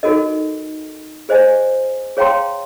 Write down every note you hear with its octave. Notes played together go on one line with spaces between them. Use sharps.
D#4 F#4 A4 A#4 D#5
G#4 C5 D#5 G#5
G#4 C#5 F5 G5 A#5 C6